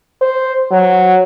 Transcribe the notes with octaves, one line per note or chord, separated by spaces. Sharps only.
C5
F#3